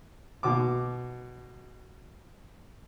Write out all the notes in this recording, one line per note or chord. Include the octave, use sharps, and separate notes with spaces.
B2 D6